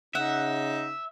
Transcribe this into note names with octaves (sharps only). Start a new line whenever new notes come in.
C#3 D#4 E5 F#5